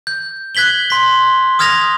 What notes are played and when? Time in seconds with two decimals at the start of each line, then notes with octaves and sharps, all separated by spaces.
0.07 G6
0.55 F#6 G#6 B6 F#7 G7
0.90 C6 B6
1.59 D#6 F6 G#6 A#6 F7